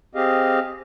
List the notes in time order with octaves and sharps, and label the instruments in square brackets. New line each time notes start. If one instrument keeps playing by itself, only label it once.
[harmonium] C4 G4 G#4 D#5 F5